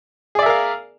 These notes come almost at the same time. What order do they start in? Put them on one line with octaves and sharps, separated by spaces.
G#4 D5 E5 A#4 F5